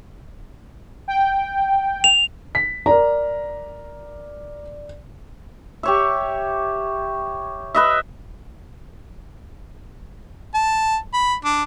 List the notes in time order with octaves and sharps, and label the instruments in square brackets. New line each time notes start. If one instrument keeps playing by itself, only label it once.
[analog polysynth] G5
[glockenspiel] F7
[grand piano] B6
[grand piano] A#4 A#5 [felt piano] D5
[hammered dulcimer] G4 C#5 E5
B4 D#5 E5
[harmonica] A5
B5
D4